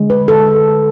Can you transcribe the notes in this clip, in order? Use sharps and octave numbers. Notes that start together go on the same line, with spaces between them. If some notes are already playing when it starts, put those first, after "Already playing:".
Already playing: D3 G#3
B4
A4